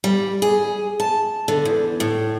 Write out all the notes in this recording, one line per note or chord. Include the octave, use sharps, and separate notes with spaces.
G3
G#4
A5
D3
E2
A2